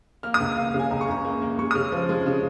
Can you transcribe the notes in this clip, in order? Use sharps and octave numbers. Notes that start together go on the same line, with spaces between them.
A#3 F6
D#6
C#2
A#3 F5
F5
C#3
G#5
C#2 A#5
C#6
C#2 A#5
A#3
A#3
G#3 C#6
D#6
C#3 F6
F3
G#3
C#3